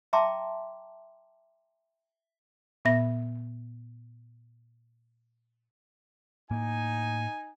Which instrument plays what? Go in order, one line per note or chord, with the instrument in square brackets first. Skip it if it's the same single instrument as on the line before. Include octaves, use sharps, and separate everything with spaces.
[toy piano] E5 G5 A5 A#5 C6 D6
[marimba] A#2 B3 E5 A#6
[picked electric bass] A2 A#3 [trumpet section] D#4 G#5